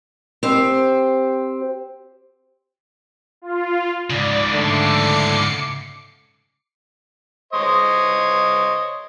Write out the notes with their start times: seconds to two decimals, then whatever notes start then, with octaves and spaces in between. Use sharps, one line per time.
0.43 C4 G4 C5
3.42 F4
4.10 G#2 C#3 D5
4.53 D3 A3 D6 C7 C#7
7.53 C5 C#5 D#5